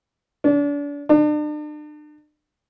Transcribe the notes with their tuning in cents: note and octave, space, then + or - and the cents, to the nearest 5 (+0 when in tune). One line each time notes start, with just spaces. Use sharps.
D4 -35
D4 +40